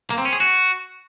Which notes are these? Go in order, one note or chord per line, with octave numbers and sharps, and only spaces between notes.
A#3
C4
C#4
G#4
F#4